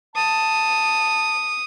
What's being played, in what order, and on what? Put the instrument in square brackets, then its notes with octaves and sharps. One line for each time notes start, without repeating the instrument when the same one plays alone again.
[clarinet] A5 [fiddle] D#6